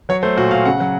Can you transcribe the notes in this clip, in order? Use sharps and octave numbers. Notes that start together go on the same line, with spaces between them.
F#3 C#5
A3 C5
A#2 F#4
A#2 F5
C#3 F#5
F#3